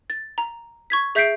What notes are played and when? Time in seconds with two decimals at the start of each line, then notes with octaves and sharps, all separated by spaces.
0.10 A6
0.38 A#5
0.90 C#6 G#6 B6
1.15 G#4 E5 G6 B6 C7 D7